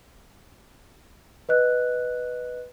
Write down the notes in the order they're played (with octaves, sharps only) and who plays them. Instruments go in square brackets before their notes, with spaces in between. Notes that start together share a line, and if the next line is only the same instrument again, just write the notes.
[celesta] B4 D#5 F#6